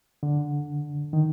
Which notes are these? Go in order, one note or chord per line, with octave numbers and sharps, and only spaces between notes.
D3
D#3